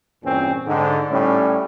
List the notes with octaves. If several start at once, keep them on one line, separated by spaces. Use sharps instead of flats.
E2 G2 A#2 C4 C#4
G#2 D3
A2 G3 C#4